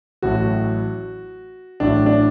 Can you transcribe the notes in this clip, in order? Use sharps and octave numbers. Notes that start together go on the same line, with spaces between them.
A1 A2 F#3 F#4
A1 A2 F#3 D4
D4